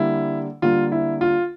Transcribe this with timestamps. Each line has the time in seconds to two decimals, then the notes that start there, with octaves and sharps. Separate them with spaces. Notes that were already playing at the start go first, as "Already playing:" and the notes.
Already playing: D3 G3 A#3 E4
0.62 D3 G3 A#3 F4
0.92 E4
1.21 F4